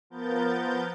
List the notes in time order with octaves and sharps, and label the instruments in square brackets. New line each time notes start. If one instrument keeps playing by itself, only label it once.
[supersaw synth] F3 B3 A#4 G6 A6